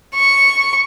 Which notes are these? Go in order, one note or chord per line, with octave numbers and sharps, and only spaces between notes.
C#6